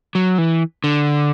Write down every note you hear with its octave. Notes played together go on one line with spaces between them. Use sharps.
F#3
E3
D3